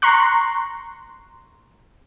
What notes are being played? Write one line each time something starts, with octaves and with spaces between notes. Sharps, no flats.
A#5 C6 C#6 F#6